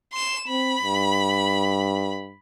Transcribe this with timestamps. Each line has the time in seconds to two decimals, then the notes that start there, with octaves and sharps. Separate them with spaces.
0.13 C6 E7
0.48 C4 B5
0.83 G2